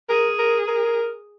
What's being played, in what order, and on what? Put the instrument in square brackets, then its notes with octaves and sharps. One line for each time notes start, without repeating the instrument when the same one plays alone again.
[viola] G#4 [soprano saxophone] A#4
[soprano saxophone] A#4
A#4